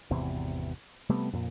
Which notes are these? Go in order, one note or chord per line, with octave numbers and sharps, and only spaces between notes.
G#1 E2 C3 E3
C3 G3 A3 B3
F2 A#2